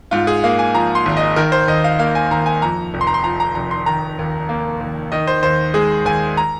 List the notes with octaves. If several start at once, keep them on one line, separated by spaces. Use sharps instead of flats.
G#2 F4
G#4
A#3 F5
G#5
F3 A#5
C6
G#1
D#5
D#3 A#4
C5
D#2 D#5
F5
A#3 F5
G#5
D#2 A#5
G#5
F2 A#5
F1
C6
A#5
C6
F3 A#5
A#5
F1 A#5
C6
D#3 A#5
D#2
A#3
D#2
D#3 D#5
C5
D#2 C5
G#3 G#4
D#2 G#5
A#5